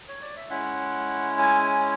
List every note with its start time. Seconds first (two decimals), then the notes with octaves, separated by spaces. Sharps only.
0.08 C#5
0.22 D5
0.36 E5
0.49 G#3 C#4 E4 F#5
1.39 G#5
1.61 G#5